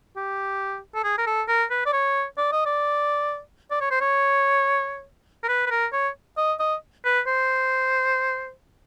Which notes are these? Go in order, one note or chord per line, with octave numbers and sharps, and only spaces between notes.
G4
A4
G#4
A#4
A4
A#4
B4
D5
C#5
D5
D#5
D5
D5
C#5
C5
C#5
A#4
B4
B4
A#4
C#5
D#5
D#5
B4
C5